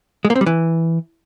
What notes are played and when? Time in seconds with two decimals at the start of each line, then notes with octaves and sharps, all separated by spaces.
0.25 G#3
0.30 A#3
0.36 C4
0.41 G3
0.46 E3